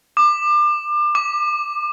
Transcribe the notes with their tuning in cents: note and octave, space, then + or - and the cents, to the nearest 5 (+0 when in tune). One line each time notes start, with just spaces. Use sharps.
D6 +30
D6 +10